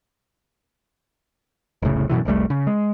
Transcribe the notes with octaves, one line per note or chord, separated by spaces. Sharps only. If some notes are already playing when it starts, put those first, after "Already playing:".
F1 C2 A2 C#3
F#2 B2 D3 E3
F1 C2 G3 A3
C#3
G#3